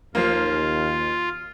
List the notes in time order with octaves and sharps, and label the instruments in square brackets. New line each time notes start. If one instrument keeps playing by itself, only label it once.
[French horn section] D#2 [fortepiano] F3 A#3 [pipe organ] F4